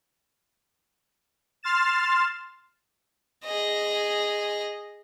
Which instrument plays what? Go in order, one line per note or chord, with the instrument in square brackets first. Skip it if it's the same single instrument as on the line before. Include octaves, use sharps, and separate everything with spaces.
[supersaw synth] C6 F6 A6 E7
[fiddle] G#4 D#5